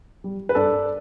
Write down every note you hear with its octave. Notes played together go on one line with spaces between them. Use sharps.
G3
B4
G2 A4 D5